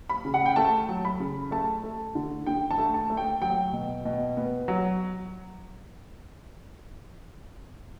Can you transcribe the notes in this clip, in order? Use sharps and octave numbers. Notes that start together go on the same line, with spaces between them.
B5
C#3
F#5
G5
A3 A5
F#3
B5
C#3
A3 A5
A3
D3
D3 G5
A5
A3
A5
A3
G5
F#3 G5
B2
B2
B3
F#3